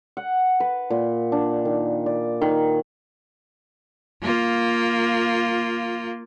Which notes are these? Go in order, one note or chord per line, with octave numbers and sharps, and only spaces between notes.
F#5
B4
A#2
D4
D#3
D5
D#3
A#3 F4